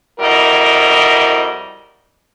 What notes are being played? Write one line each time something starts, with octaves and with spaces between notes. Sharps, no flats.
F2 G3 E4 F#4 A#4 D#5